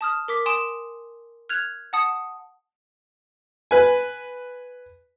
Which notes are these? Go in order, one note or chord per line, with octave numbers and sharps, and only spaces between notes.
A5 D#6 F6
A#4 D6 B6
G#5 C6 D#6 D7 E7
F6 F#6 G#6 F7
F#5 A5 D#6 C#7
B4 G#5